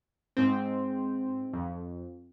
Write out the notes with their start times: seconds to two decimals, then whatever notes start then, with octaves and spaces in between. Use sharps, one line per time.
0.37 G#2 C4
1.53 F2